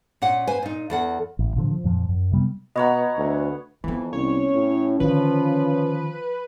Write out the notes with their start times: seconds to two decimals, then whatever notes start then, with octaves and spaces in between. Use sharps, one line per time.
0.22 A#2 C#4 F#5
0.47 B4 C5 G#5
0.62 A#2 D#4
0.90 E2 A4 F#5
1.39 A1
1.56 A#2 D3 F3
1.70 F3
1.84 F2 A#2 F3
2.09 F#2
2.32 C3 G3 B3
2.76 B2 B3 C#5 D#5 F#5 A#5
3.17 D2
3.84 F2 E3 B3 C4
4.13 C2 C#4 C#5
4.54 A2
5.00 D3 D#3 F3 B4